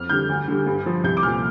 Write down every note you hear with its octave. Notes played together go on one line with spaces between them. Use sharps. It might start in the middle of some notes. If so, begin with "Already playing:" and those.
Already playing: F2 F6
D3 G3 G6
D2
D3 G3
G2
F3
C2 G6
D6
A#2 F3 F6